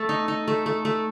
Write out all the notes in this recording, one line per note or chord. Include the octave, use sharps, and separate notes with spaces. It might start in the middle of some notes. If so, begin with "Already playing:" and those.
Already playing: A3 A4
D#4
D#4
A3
A3
A3